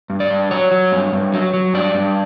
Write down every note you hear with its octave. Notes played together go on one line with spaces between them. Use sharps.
G2
D5
G2
F#3 C#5
F#3
G2
G2
F#3
F#3
G2 D5
G2